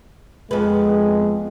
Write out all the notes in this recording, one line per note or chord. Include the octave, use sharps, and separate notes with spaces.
F2 G#3 B3